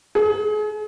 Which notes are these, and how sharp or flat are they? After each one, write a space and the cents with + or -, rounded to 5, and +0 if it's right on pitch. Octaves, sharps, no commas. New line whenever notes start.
G#4 +35